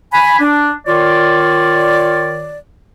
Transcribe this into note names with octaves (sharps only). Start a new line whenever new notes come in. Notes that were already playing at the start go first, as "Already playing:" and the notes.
G#5 B5
D4
D#3 F4 C#5 D5